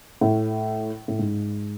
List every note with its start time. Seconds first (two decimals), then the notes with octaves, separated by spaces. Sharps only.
0.21 A2
1.08 A2
1.19 G#2